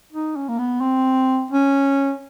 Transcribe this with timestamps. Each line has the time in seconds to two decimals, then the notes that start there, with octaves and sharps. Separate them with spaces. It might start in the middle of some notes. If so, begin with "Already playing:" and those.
0.13 D#4
0.36 C#4
0.49 A#3
0.59 B3
0.81 C4
1.51 C#4